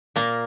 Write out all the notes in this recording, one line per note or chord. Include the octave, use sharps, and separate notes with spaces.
A#2 A#3